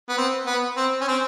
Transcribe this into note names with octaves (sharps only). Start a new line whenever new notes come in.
B3
C4
B3
C4
C#4
C4